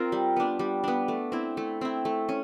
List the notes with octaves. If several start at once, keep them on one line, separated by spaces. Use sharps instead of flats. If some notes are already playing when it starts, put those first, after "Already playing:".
Already playing: C4 F4 A#4
G3
B3 D4
G3
B3 D4
A3
C4 E4
A3
C4 E4
A3
C#4